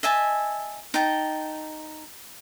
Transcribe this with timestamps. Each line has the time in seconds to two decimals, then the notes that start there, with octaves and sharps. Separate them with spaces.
0.03 D#5 E5 G#5 A5
0.94 D#4 G5 A5